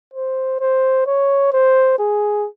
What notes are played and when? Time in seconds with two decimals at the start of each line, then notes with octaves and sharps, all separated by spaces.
0.14 C5
0.60 C5
1.07 C#5
1.53 C5
1.99 G#4